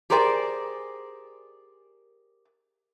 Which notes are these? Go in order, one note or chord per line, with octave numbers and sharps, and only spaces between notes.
G4 G#4 A#4 C5 D5 G#5